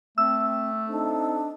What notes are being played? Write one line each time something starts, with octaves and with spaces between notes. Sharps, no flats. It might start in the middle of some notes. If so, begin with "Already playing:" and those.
A3 C4 E6
C4 D4 D#4 A4